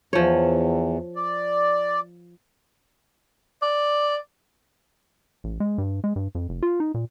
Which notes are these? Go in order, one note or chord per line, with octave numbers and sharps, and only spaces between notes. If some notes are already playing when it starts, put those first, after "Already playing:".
E2 F3 C#5
D5
D5
A1
G#3
G2
G#3
G2
F2
F1
F4
D#4
A#2